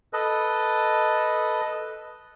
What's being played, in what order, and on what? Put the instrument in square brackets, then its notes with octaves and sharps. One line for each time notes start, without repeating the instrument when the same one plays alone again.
[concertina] A4 B4 D#5